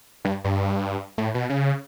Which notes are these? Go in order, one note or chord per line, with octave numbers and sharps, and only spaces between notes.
G2
G2
A2
B2
C#3